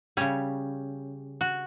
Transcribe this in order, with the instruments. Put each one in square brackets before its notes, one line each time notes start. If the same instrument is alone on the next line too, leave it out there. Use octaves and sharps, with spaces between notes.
[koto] C#3 G3 C#4
F#4